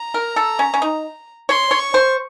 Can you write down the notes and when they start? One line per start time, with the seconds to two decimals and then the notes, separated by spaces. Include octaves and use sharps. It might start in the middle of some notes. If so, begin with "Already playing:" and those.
Already playing: A#5
0.14 A#4
0.36 A4
0.59 C#4
0.74 C#4
0.82 D#4
1.49 C#5 C6
1.71 C#5
1.79 C#6
1.94 C5